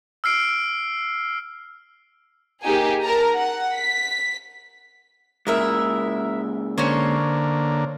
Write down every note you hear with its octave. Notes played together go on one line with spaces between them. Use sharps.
E6 F6 C7 D7
A#3 D#4 G4 G#4 G#5
A#4 A5 A#5
F#5
B6
A#2 C#3 G#3 E4 A#4 E5
D3 A#3 C#4 C5 C#5